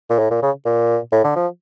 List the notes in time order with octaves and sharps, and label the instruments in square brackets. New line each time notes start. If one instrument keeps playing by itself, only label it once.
[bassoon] A#2
A2
A#2
C#3
A#2
A2
D3
F3